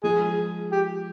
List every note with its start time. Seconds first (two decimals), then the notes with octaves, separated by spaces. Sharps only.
0.03 F3 G#3 G#4
0.71 G4